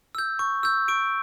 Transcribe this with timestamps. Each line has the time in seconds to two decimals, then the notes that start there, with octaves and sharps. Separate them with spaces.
0.15 E6 G6
0.39 C#6
0.63 E6 G6
0.88 C#6 D7